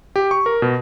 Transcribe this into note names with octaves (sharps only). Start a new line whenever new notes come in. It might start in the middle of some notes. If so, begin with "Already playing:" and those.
G4
C#6
A#4
B2